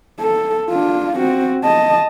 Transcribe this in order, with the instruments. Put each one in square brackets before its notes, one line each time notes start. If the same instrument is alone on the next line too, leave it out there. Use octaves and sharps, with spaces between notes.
[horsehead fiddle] A4
D4 F4
C4 F#4
D#5 A5